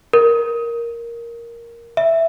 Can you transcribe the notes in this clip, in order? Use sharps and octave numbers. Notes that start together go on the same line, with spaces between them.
A#4
E5